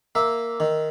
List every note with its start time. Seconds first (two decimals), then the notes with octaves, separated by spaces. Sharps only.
0.15 A#3 E5
0.60 D#3